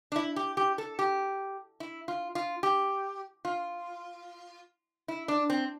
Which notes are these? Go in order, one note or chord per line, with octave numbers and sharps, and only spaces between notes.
D4
E4
G4
G4
A4
G4
E4
F4
F4
G4
F4
E4
D4
C4